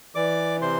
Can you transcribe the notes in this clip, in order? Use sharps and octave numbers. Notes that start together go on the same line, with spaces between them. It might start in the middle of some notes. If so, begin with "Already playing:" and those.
E3 D5 D6
C3 C5 C6